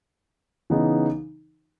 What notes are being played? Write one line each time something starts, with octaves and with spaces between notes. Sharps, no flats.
C#3 E3 B3 D#4